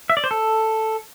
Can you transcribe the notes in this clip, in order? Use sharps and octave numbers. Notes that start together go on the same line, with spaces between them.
E5
D5
C5
A4